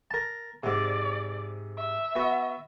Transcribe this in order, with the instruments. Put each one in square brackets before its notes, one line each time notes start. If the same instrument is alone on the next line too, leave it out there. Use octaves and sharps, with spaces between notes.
[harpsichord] A#4 A5
[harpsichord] G#2 C3 [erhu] D5
[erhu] E5
[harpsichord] B3 F#4